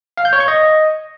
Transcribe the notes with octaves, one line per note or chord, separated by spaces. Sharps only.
F5
G6
C#5
C#6
D#5